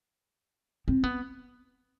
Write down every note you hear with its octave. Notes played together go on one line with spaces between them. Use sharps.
C4
B3